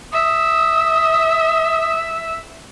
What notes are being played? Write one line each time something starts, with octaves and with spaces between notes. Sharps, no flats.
E5 D#6